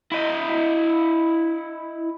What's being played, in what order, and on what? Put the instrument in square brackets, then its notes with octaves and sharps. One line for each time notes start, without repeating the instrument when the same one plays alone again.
[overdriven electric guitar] E4 D#5